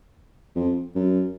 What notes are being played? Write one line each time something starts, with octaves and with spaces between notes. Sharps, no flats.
F2
F#2